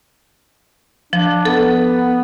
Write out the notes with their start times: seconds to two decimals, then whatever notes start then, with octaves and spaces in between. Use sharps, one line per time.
1.13 F3 D4
1.45 B3 A4